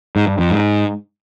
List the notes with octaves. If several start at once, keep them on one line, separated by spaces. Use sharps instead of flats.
G#2
G2
F2
G#2